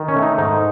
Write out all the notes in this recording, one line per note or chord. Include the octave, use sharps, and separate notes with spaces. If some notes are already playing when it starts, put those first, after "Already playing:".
Already playing: D#3
C#4
A3
D#4
G#2 D#4